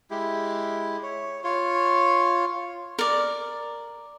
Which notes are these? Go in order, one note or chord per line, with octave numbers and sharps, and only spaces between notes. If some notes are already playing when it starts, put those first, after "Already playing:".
G#3 E4 G4
C#5
F4 C#5
A#4 D5